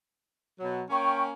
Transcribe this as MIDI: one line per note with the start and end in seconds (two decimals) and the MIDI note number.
0.60 0.83 47
0.60 0.83 54
0.90 1.32 58
0.90 1.32 61
0.90 1.21 79
0.90 1.21 85